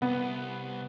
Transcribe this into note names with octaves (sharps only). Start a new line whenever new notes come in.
C2 B3